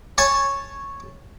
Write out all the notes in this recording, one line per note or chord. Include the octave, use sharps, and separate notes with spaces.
C#5 G#5 A5 C#6